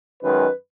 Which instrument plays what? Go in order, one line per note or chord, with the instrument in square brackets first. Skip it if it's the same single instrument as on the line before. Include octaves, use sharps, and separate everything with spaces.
[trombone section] F#2 D#3 G#3 B4